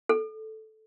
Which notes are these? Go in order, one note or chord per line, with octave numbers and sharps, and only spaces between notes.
A4